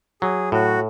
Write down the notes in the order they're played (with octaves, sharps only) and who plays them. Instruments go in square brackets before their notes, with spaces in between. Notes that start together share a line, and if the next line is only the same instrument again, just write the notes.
[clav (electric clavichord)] F#3 [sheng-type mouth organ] G#4
[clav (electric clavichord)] A2 [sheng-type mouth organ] F#4